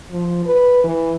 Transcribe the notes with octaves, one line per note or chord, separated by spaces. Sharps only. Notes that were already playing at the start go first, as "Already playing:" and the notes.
F3
B4
E3